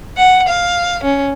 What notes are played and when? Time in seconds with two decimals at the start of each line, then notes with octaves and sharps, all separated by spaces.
0.17 F#5
0.48 F5
1.03 C#4